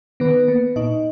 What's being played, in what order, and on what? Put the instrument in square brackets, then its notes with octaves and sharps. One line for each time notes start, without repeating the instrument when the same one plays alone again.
[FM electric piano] D#3 B3 B4
A#3
A#2 D#4 D#5